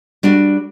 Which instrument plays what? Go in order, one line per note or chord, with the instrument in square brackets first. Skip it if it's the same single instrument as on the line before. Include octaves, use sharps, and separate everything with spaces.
[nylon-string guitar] G3 D4 F#4